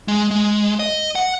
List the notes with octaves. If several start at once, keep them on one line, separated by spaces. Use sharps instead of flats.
G#3
G#3
D#5
F#5